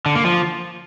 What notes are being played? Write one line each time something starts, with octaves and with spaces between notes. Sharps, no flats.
D3
A#3
F3